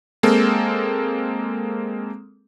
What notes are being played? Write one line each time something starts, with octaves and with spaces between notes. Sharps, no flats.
G#3 A#3 C4 A4